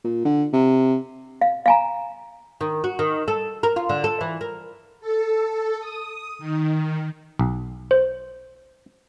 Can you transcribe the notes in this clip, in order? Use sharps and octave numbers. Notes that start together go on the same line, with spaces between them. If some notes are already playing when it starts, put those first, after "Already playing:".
A#2
D3
C3
F5
F5 G#5 A#5
D#3
F#4
D#3
A4
A#4
F4
D3
A4
E3
A#4
A4
D#6
D#3
B1
C5